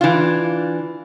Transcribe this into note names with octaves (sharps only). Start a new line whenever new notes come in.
E3 D4 F4